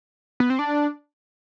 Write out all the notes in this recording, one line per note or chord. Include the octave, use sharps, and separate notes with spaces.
B3
C4
D4